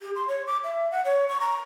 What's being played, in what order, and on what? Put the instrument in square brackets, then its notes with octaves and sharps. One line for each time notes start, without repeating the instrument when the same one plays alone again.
[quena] G4
C6
C#5
D6
E5
F#5
C#5
C#6
A#5